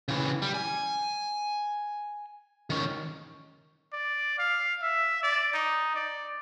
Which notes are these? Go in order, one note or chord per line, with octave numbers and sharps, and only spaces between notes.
C#3 E3
G3
G#5
D#3 C#4
D5
F5
E5
D5
D#4
D5